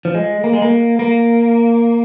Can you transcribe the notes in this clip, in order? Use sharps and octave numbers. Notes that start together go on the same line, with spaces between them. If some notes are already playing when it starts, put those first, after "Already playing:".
F3
G#3
A#3
G#3
A#3
A#3